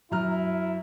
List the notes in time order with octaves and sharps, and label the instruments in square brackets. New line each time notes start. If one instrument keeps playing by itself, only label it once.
[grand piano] F#2 A#5 F6 [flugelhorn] E4